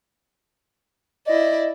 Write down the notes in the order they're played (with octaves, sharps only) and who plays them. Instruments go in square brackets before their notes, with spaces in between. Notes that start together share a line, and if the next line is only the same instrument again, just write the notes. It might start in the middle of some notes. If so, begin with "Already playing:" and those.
[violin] E4 D5 [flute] D#5